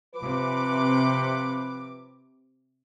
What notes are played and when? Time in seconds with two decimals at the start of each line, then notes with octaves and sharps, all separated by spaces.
0.16 C3 F3 B4 D6